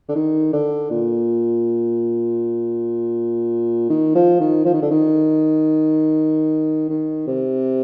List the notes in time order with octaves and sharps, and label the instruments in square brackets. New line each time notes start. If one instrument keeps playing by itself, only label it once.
[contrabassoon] D3
D#3
D3
A#2
D#3
F3
D#3
F3
D#3
D3
D#3
D#3
C3